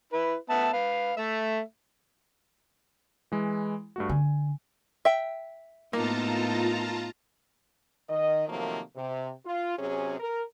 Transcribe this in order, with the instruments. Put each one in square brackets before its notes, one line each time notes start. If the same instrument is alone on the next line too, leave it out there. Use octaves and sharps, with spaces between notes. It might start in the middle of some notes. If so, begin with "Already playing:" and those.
[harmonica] E4 B4
B3 E5 A5
B4 F5
A3 E5
[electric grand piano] E3 G#3 E4
G2 A3 F#4
[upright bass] D3 [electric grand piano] G#5
[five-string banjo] E5 G5
[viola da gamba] A2 B3 D#4 [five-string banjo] A#3 [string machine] F4 A5 A#5
[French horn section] D#3 D#5
C3 D#3 F3 F#3 A3 A#3
C3
F4
C3 F#3 C#4 G#4
A#4